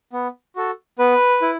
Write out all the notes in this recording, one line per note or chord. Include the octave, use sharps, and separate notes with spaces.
B3
F#4 A4
B3 B4
E4